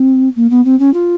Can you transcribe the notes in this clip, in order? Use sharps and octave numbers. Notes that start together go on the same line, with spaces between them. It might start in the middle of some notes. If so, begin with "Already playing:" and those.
Already playing: C4
A#3
B3
C4
C#4
F4